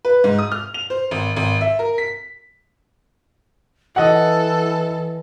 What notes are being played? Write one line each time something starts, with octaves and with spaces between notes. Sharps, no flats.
B4
G#2
D#6
F6
F7
C5
G#1
G#1
E5
A#4
B6
E3 A4 D#5 F#5